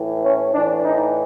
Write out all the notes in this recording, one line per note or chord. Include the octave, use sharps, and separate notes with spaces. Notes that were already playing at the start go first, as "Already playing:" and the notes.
Already playing: A2 E3
C#4
A2 E3 D4
D#4